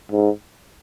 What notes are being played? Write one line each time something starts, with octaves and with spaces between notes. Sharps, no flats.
G#2